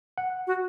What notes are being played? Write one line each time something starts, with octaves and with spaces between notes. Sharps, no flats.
F#5
F#4